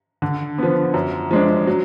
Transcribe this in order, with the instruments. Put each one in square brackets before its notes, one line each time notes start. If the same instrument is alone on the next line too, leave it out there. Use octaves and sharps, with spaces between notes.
[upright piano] D3
F3 B3
F#2
F3 G#3 D4
F#3